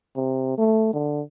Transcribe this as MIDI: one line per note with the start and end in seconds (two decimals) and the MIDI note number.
0.16 0.56 48
0.58 0.89 57
0.93 1.21 50